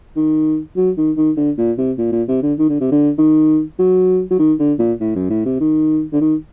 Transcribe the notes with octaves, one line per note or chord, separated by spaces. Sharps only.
D#3
F#3
D#3
D#3
D3
A#2
C3
A#2
A#2
C3
D3
D#3
D3
C3
D3
D#3
F#3
F#3
D#3
D3
A#2
A2
F#2
A2
C3
D#3
D3
D#3